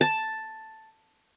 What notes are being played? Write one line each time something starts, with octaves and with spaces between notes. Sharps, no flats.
A5